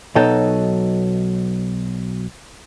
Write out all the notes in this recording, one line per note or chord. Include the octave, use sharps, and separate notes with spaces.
B1 B2 F#3 D#4 A4 G5